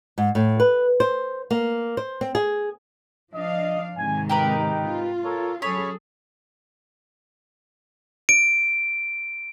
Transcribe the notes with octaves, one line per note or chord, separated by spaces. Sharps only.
G#2
A2
B4
C5
A#3
C5
C4
G#4
F3 D4 D#5 F5
G#2 C3 D#3 G#5
D#4 G4 A#4 B4
F4
A4 A#4 C#5
F#3 C#4 G#4 A4 C#5 B5
D7